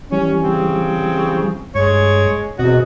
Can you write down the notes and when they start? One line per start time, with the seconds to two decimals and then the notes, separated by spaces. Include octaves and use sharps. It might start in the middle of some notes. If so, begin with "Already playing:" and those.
0.12 E3 G3 C#4
0.43 C#3 C4
1.75 G2 G#3 C#5
2.59 E2 B2 C4 F#4 D#5